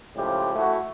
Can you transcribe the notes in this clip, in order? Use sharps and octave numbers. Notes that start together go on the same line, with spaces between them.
A2 C#3 F3 G#3 G4
A3 E4 F#4